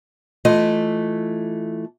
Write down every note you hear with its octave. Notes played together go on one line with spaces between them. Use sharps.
E3 A3 F4 D#5